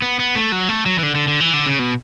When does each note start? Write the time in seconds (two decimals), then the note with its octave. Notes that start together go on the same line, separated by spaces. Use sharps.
0.02 B3
0.19 B3
0.36 A3
0.52 F#3
0.69 A3
0.86 F#3
0.99 E3
1.03 D3
1.15 D3
1.28 D3
1.40 E3
1.53 D3
1.66 C#3
1.79 B2